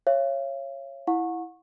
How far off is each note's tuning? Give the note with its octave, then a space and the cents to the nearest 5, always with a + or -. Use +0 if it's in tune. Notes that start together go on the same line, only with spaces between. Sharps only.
C#5 -15 F5 -40
E4 +0 F#5 -30 C#6 -20